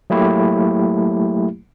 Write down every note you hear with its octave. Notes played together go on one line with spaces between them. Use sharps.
F#3 A3 A#3 E4 G4